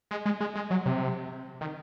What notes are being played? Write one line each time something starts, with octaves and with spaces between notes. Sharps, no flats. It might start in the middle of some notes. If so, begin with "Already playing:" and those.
G#3
G#3
G#3
G#3
F#3
C3
D#3